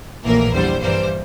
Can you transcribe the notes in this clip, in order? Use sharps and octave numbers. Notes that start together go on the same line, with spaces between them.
A#1 A2 E3 A#3 A#4
E2 D3 G3 C5
G2 E3 G3 A#3 C5